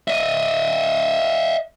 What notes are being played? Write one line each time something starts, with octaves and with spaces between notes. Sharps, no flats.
D#5 E5